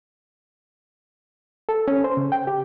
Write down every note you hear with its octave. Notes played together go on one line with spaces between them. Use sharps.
A4
C#4
C5
C#3
G5
G4